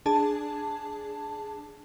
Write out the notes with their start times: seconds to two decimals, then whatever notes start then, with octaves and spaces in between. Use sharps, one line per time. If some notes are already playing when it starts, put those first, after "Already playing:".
0.06 D4 G#4 A5